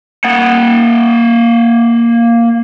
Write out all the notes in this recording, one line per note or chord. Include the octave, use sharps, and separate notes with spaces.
A#3 F#5